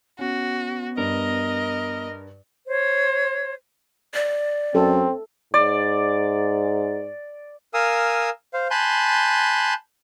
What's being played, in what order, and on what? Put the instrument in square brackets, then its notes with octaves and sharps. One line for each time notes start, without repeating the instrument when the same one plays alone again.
[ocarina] B3 [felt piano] C#4 [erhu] F#4
[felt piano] G2 [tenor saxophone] A#4 [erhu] D#5
[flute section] C5 C#5
[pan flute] D5
[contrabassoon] F#2 [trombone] C4 [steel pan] A4
[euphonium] G#2 [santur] D5
[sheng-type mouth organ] A#4 F5 G#5 D#6 E6
C5 F5
G#5 A5 B5 C6 F#6 G6